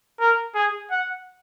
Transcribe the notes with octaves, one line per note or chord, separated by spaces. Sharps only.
A#4
G#4
F#5